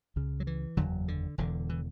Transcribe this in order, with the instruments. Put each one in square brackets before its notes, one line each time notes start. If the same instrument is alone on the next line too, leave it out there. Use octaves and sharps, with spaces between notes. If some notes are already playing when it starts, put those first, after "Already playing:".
[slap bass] C#2 C#3
F#3
E3
F#1 E2 D3 F#3
D3
E1 E2 D3
E3